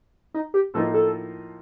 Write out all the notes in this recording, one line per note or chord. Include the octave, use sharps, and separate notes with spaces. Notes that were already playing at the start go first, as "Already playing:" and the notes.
D#4
G4
A2 F3 A#3 D#4 A4
A4